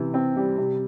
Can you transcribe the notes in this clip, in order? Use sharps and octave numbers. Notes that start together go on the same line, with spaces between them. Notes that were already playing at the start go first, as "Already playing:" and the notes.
Already playing: C3 E3
C4
G3
C3